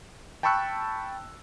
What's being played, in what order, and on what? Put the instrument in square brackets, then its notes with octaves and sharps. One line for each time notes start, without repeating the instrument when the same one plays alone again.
[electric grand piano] G5 A5 B5 C#6 E6 F#6